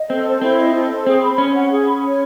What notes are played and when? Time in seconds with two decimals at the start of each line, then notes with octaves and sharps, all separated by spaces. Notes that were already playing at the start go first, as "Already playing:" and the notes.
Already playing: D#5
0.09 C4 A4
0.25 C5
0.42 C4 E4
0.57 D#5
0.73 A4
0.90 C5
1.06 C4 G#4
1.22 B5
1.38 C#4 C#5
1.54 F#5
1.71 G#4
1.86 B5
2.03 C#5